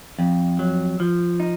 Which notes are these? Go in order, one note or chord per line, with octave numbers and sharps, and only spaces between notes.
F2
F#3
F3
D#4